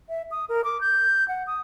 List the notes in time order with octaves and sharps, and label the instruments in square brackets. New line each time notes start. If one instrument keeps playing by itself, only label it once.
[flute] E5
D#6
A#4
D6
G6
F#5
D#6